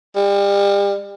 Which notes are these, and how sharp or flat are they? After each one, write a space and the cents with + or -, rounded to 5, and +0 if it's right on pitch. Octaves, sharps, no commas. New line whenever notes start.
G3 +35